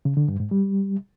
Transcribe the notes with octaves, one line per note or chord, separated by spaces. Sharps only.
C#3
D3
G2
G#2
G3